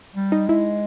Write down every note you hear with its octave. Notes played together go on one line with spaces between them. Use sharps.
G3
D#4
G#3 E4